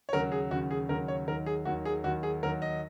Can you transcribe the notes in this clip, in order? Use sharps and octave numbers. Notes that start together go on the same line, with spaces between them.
C#5
D#2 C#3 F#3 A#4
G#4
D#2 C#3 F#3 F#4
G#4
D#2 C#3 F#3 A#4
C#5
D#2 D#3 F#3 A#4
G#4
D#2 D#3 F#3 F#4
G#4
D#2 D#3 F#3 F#4
G#4
D#2 D#3 F#3 A#4
D#5